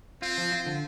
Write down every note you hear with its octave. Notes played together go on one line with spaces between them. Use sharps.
C4 F4
F3
F4
D3